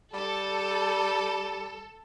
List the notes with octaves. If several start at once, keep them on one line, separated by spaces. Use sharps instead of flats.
G3 A4